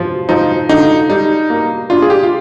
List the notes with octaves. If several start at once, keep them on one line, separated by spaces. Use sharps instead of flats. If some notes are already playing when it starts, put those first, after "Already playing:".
Already playing: F3
F3 D#4
D3 D#4
G3 D#4
A#3
D4 F4
G#4
G4
F4